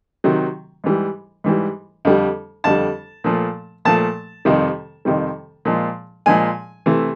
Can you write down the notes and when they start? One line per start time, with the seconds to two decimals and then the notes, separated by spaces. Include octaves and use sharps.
0.24 C3 D#3 F#3
0.84 G#2 E3 G3
1.44 G#2 E3 G3
2.05 F2 D3 G3
2.64 F2 D3 G3 A5
3.24 A#2 F3 A3
3.85 A#2 F3 A3 A5
4.45 F2 C3 D#3 G3
5.05 F2 C3 D#3 G3
5.65 A#2 F3 G#3
6.26 A#2 F3 G#3 G#5
6.86 C3 E3 A3